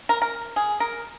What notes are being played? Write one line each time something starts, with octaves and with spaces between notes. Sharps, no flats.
A#4
A#4
G#4
A#4